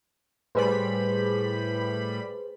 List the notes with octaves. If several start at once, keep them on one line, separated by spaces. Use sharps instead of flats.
A2 G3 G#4 B4 C5 B5